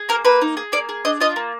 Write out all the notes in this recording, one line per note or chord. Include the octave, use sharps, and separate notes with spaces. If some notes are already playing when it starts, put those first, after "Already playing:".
Already playing: G#4
A#3 A#4
A#3 B4
D#4
G#4
A#3 D5
G#4
D4 D#5
F4 D#5
A#3